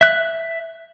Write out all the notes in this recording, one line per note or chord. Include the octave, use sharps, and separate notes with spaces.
E5 F#6